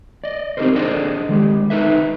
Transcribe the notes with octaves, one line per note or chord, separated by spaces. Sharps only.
D5 D#5
C4 D#4 G4 A4 A#4 C5
D4 G#4 A4 C5 D5 D#5
D#3 G#3 G4
D#4 A4 B4 E5